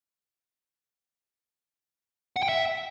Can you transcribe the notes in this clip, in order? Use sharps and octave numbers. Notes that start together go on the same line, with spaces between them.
F#5
G5
E5